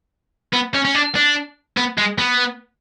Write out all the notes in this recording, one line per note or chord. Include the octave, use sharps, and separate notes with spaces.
B3
C#4
C#4
D4
D4
B3
G#3
B3